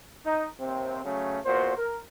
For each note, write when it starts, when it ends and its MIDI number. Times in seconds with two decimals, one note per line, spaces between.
0.25 0.47 63
0.60 1.04 39
0.60 1.04 48
0.60 1.04 60
1.04 1.38 49
1.04 1.38 54
1.04 1.38 57
1.04 1.38 61
1.45 1.74 40
1.45 1.74 46
1.45 1.74 66
1.45 1.74 72
1.77 1.97 70